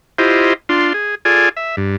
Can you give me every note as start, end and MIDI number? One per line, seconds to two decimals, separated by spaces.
0.19 0.54 64
0.19 0.54 65
0.19 0.54 67
0.19 0.54 72
0.19 0.54 75
0.69 0.93 62
0.69 0.93 65
0.69 0.93 84
0.94 1.15 68
1.25 1.49 65
1.25 1.49 68
1.25 1.49 69
1.25 1.49 74
1.25 1.49 80
1.57 1.76 76
1.77 1.96 43